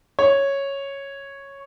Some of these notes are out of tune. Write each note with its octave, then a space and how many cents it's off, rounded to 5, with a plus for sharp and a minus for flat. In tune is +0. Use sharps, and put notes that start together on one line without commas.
C#5 -5